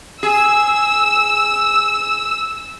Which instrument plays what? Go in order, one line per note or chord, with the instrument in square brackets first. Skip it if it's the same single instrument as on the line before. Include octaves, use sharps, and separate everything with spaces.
[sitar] G#4 [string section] E6